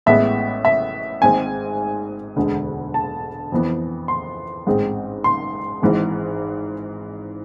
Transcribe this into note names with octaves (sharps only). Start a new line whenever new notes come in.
A1 A2 G#3 B3 E5
E5
G#1 G#2 G#3 C4 G#5
E1 D2 D3 G#3
A5
F2 E3 B3
C6
A1 G#2 G#3 C4
C6
G#1 G#2 E3 G#3